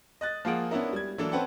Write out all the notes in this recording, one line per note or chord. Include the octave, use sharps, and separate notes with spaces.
D#5 F#6 A6
F3 A#3 F4 G#4 F#5 D7
B3 C#4 D4 E4 A#4
G3 G#6
E3 F#3 A#3 D4 A4
C4 C#4 B4 F#5 G5 A5